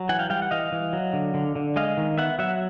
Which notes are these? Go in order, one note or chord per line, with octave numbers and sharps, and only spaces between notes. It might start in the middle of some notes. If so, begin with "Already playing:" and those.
Already playing: F#3
E3 F#5 G#5
F5 G5
G3 F5 G5
F#5
E3 D#5 F5
E3
F#3
D3
D3
D3
G#3 D#5 F5
D#3
B3 E5 F#5
F#3 E5 F#5